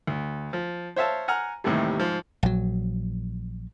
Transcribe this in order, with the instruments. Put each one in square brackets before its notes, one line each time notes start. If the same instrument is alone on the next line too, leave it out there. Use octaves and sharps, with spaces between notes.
[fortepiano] D2
F3
C5 C#5 E5 F5 A5
F#5 G#5 A#5 F6
D#2 A2 C3 E3 G3
G#2 F3
[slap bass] A#1 F#3